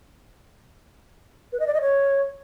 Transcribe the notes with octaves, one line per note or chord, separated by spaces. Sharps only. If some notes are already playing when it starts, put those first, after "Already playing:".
B4
D#5
D5
D#5
C#5